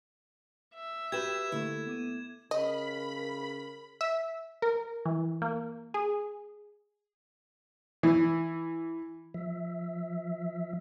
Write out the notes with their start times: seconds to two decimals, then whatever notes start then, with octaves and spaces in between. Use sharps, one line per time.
0.75 E5
1.12 F#4 G4 B4 G#6 E7
1.52 D3 A3 A#3 E4 G4
1.86 B3 D6 D#7
2.51 C#3 A#4 D#5 B5
4.01 E5
4.62 A#4
5.05 E3
5.42 A#3
5.94 G#4
8.03 E3
9.34 F3 E5